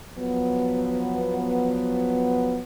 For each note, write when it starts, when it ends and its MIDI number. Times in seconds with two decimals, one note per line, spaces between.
0.18 2.63 53
0.18 2.63 54
0.18 2.63 59